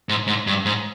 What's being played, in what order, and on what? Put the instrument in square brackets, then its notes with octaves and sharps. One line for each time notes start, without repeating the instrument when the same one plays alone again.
[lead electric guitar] G#2
G#2
G2
G#2